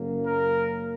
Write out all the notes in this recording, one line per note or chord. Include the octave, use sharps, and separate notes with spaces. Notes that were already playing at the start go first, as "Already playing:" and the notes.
Already playing: F#1 F#2 C#3 A#3
A#4